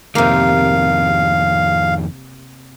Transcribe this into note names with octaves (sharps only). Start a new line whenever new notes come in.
F2 C3 D#3 A#3 F5